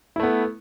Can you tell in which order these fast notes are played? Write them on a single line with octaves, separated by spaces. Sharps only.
E4 A3 B3